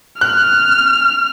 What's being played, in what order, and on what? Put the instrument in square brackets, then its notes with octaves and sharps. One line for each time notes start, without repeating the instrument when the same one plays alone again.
[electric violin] F6 [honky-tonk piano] F#6